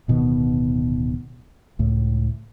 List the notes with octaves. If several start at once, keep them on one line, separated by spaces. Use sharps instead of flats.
D1 B2 D#3 B3
C#2 A2